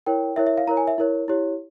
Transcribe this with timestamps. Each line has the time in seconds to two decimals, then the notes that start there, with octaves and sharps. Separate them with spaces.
0.06 E4 A#4 C#5 G5
0.36 E4 A#4 C#5 E5
0.47 E5
0.57 F5
0.67 E4 A#4 C#5 A#5
0.77 G#5
0.87 E5
0.98 E4 A#4 C#5
1.28 E4 G4 C#5